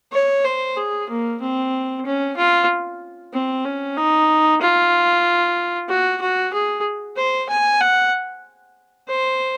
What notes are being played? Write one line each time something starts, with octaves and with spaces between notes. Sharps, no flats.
C#5
C5
G#4
A#3
C4
C#4
F4
C4
C#4
D#4
F4
F#4
F#4
G#4
C5
G#5
F#5
C5